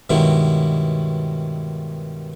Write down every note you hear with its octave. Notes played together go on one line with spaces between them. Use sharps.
G2 B2 D#3 F#3 G#3 E4